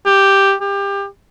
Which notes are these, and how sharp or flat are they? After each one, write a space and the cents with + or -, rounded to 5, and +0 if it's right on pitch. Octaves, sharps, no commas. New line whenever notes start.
G4 +0
G4 +25